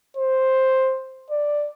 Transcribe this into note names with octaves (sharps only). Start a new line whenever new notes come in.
C5
D5